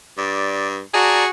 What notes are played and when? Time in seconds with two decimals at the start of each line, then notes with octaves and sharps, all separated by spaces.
0.18 G2 D5
0.94 F#4 G#4 D5 A5 A#5